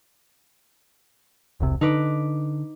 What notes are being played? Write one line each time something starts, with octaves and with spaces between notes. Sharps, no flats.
E1 C2 C3
D3 D#4 B4 D6